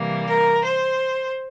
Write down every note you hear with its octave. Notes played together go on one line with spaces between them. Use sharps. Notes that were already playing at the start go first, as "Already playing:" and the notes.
Already playing: C3 E3 G3 A#3
A#4
C5